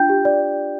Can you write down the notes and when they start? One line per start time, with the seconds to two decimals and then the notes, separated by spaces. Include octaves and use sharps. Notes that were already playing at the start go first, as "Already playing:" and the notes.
Already playing: D4 F4 G5 G6
0.09 G4
0.25 D5